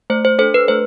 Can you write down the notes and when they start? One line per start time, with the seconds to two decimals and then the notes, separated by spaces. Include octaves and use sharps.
0.10 A3 C5
0.25 C5
0.39 D4 A4 C5
0.54 B4
0.68 A3 C5